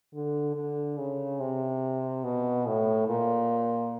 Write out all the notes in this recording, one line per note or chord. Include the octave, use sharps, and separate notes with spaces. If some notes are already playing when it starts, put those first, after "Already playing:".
D3
D3
C#3
C3
B2
A2
A#2